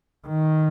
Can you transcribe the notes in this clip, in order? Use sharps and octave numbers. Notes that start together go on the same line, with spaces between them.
D#3